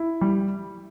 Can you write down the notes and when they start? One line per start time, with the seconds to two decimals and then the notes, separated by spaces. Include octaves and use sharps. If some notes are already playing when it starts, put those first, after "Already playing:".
Already playing: E4
0.21 G3